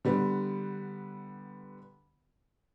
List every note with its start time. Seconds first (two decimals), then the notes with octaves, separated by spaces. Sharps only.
0.05 D3 G3 B3